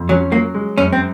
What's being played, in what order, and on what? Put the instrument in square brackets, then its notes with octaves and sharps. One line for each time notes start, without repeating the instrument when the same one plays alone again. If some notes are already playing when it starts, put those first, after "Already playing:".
Already playing: [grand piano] F2
[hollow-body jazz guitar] F#3 [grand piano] C#4
[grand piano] F#3 [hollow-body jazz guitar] A#3
[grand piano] G#3
[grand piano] F#2 [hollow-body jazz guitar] C#4
[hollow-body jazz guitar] C4